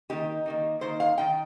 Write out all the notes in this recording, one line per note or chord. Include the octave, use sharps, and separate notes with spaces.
D#3 A#3 D#4 G4
D#3 A#3 D#4
D#3 A#3 D#4 C5
F5
D#3 A#3 D#4 G5